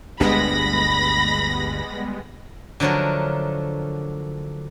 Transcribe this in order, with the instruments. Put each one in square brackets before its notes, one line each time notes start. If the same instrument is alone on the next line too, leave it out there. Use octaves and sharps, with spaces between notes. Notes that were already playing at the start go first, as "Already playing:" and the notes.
[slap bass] G1 D2 D4 [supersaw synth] G3 G#3 B3 [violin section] B5 A#6
[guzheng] D3 F3 F#3 A3 A#4